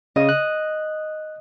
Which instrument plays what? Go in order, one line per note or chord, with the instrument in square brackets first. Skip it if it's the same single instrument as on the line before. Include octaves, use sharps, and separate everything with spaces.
[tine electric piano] C#3 [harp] D#5
[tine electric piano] F#6